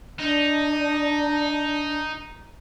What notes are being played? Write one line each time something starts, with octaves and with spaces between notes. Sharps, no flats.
D4 D#4